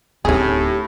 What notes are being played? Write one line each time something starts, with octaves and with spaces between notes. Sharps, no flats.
D1 A2 C#4 D#4 G4 G#4